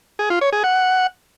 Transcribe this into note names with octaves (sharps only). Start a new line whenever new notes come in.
G#4
F4
C#5
G#4
F#5